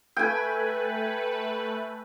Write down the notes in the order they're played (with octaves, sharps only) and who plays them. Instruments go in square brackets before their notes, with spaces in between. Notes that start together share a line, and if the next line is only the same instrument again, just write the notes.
[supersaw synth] A3 B4 [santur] G5 G#5